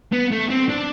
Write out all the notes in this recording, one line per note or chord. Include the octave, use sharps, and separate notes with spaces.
B3
A3
C4
D4